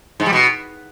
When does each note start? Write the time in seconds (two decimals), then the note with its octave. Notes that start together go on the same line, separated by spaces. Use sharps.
0.20 G#2
0.26 G3
0.33 B2